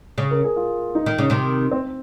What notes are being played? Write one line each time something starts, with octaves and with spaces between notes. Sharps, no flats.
C#3
A#4
G#4
F4
D#4
D#3
C#3
C3 D#3
C4